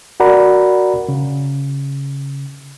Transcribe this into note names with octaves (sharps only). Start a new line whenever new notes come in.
F#4 A#4 D5 F#5 A#5 B5
C#3